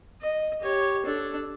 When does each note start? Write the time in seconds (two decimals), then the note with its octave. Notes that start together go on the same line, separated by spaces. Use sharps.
0.22 D#5
0.61 G4 C#5
1.06 D4 A4